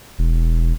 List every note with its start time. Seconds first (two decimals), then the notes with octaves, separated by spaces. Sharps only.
0.19 E1